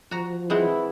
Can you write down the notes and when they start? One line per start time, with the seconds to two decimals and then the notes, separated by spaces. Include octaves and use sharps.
0.11 F3 F#4 A#5
0.50 E3 G#3 C4 E4 F#5